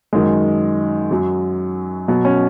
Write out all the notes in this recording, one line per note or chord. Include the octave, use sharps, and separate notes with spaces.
F#2 D#3 F#3 G#3
F#2 F#3
B2 F#3
C#4